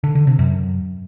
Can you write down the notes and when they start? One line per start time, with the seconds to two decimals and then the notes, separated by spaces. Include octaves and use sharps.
0.04 D3
0.15 D3
0.27 C3
0.39 F#2